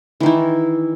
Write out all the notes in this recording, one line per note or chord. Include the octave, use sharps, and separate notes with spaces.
D#3 E3 E4